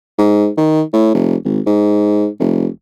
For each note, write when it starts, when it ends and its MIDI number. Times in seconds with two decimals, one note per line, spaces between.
0.18 0.49 44
0.57 0.82 51
0.93 1.10 45
1.14 1.36 29
1.45 1.60 32
1.66 2.27 44
2.40 2.67 29